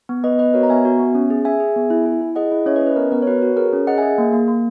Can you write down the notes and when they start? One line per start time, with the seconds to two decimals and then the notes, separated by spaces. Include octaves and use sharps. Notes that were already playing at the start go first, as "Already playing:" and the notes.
0.09 B3
0.23 B3 B4 D#5
0.39 B3 B4 D#5
0.54 F#4 A#4 C#5
0.63 A#5
0.69 B3 E5 G#5
0.85 F#4
0.99 B3
1.15 C#4
1.30 G#4
1.45 G#4 E5 G#5
1.60 G#4
1.76 B3
1.90 E4
2.06 E4
2.21 E4
2.35 G#4 D#5 F#5
2.52 E4
2.66 C#4 C#5 E5
2.76 B4 D#5
2.81 C#4
2.87 B4
2.96 B3 A#4
3.12 B3 A#4
3.22 C#5
3.27 F#4 B4
3.42 F#4
3.57 G#4 A#4 C#5
3.73 C#4
3.87 G#4 D#5 F#5
3.97 E5 G#5
4.02 G#4
4.18 A#3
4.33 A#3
4.48 A#3